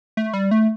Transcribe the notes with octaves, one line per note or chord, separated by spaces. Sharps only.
A3
G3
A3